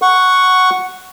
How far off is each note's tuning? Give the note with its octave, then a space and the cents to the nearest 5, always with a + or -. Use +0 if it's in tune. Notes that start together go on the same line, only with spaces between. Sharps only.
F#5 +0 C#6 +0